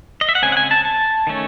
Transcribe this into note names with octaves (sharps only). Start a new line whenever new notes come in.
D#5
E5
F#5
C#3 G#3 C4 G#5
F#5
G#5
A5
A5
D#3 A3 C#4